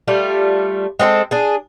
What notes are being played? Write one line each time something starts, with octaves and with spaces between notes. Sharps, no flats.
G3 A3 F4
G#3 C4 E4 A4
D4 G#4